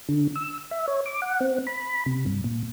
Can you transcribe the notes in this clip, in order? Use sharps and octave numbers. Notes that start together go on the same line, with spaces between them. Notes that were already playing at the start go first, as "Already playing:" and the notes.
D3
E6
E5
C#5
D6
F#5
C4
B5
C3
G2
A#2